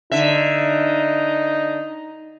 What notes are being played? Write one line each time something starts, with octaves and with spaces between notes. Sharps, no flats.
D3 D#4 E5